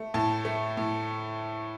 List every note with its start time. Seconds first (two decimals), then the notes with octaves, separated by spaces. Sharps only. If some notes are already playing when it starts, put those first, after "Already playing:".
Already playing: A3
0.14 A2 A5
0.45 A3
0.77 A2